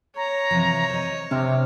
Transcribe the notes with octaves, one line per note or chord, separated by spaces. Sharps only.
C#5 A#5
C3 E3 F3
C5 D#5
C3 D4 F6